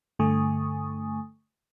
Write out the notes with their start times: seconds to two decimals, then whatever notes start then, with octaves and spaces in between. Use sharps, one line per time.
0.19 G2 D3 A3 G#5 C#6 D#6